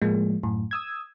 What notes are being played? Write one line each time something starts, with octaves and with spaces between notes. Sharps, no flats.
A2 F3 G#3 A#3
F#2 A2
D#6 E6 G#6